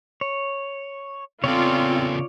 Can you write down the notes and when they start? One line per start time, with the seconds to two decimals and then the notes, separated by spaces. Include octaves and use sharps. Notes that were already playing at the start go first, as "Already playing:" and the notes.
0.21 C#5
1.44 C#3 B3 C4 F4 A4 C#5 D5